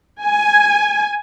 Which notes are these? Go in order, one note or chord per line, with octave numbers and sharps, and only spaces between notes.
G#5